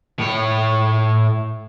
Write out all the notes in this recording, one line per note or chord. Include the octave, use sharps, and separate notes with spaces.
A2 C#5